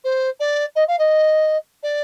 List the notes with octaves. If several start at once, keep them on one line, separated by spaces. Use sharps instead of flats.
C5
D5
D#5
F5
D#5
D5